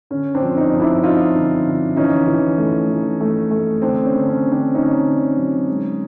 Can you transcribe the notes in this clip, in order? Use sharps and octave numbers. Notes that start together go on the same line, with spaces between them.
D3 C#4
C4 D4
F3
C#4 D#4
F3
D4 E4
F3 D#4 F4
D3
D3
E3 C#4 D#4
E3
A3
E3
A3
A3
D3 C4 D4
C#4
D3
C#4
D3
C4 D4
D3 C#4 D#4
D3
F#3
G#3